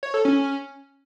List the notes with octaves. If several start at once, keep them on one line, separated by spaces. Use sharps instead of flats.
C#5
A4
C#4